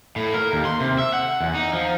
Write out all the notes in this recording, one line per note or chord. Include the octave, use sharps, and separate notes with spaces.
A2
A#4
D#2
C6
C3
E5
F#5
E2
D#4
F3